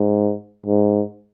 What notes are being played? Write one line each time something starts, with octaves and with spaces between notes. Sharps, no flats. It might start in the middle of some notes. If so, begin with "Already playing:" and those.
Already playing: G#2
G#2